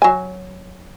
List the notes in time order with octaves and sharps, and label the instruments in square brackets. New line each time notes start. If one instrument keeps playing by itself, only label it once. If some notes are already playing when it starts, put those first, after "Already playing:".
[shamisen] F#3 G#5